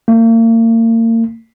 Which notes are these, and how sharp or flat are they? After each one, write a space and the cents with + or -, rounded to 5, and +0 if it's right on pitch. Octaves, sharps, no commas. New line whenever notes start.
A#3 -40